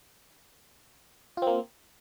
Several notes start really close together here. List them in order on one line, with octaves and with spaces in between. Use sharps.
F4 C4 A#3